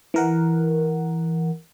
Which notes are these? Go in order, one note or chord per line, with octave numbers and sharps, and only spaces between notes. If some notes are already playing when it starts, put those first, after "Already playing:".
E3 A#4 F#5